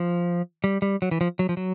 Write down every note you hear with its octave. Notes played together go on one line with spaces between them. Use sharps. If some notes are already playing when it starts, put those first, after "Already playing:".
Already playing: F3
G3
G3
F#3
E3
F3
F#3
F3
F#3